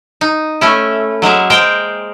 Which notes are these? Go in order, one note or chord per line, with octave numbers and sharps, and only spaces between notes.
D#4
A3 C#4 E4
F#3 G#3 A#3 E5
G#3 A#4 C5 G5